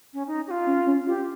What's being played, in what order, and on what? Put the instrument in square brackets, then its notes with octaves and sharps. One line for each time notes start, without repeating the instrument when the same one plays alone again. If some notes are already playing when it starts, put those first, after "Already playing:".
[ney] C#4
D#4
G4
F4
[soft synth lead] C#4
C#4
[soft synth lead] F4 [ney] G4